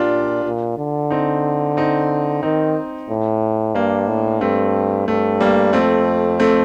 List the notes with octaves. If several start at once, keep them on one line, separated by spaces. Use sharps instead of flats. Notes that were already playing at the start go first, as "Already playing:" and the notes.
Already playing: A#2 D4 F4 G4
A#2
D3
C4 D#4
C4 D#4
D#3 C4 D#4
A2
G2 A#3 D4
A2
G2 A3 C4
G2 A3
G3 A#3
F2 A3 C4
A3 C4